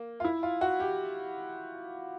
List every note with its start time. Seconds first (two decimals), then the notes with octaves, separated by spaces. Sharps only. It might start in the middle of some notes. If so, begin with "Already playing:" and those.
Already playing: A#3
0.20 F4
0.24 E4
0.43 F4
0.61 F#4
0.80 G4